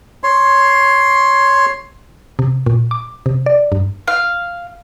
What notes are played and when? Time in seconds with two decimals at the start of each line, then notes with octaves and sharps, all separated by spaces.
0.24 C#5 C6
2.39 C3
2.66 A#2
2.91 D6
3.26 C3
3.46 D5
3.72 G2
4.08 F5